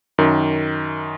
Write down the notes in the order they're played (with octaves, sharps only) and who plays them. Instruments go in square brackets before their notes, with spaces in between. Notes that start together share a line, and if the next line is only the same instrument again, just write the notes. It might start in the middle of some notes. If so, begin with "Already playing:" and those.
[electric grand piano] F#2 D#3